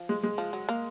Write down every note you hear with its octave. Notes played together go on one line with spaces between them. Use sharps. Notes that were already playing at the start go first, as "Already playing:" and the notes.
Already playing: F3
G#3
G#3
F3
F#3
A#3